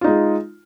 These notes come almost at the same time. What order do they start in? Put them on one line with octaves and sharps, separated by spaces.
F4 D#4 G#3